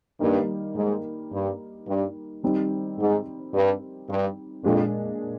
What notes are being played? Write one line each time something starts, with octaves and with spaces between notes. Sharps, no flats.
G2 D#3 G3 A#3 D#4
G#2
G2
G2
D#3 G3 C4 D#4
G#2
G2
G2
F2 A#2 G#3 D4